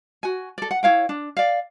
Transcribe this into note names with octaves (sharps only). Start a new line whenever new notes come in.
F#4 G#5
A4 D5
F#5
E4 C#5 F5 G5
D4
D5 F5